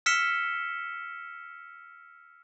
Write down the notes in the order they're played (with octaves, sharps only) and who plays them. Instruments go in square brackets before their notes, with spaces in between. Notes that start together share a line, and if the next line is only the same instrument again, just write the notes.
[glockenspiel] E6 F6 B6 C#7 E7 G7